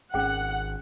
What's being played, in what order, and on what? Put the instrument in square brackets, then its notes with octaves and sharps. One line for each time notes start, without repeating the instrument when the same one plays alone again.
[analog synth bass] G#1 [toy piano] C#4 G#4 G5 [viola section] F#5